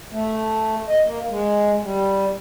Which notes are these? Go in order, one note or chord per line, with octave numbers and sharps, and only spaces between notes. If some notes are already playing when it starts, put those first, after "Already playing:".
A3
D#5
A#3
G#3
G3